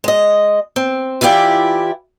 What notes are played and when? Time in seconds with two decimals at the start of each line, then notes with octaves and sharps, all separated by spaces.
0.04 G#3 D#5
0.76 C4
1.21 E3 E4 F4 G4 D5